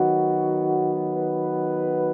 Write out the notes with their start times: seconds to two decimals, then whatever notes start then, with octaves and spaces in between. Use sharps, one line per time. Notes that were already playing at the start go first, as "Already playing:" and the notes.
Already playing: D#3 F#3 B3 F#4
1.14 B4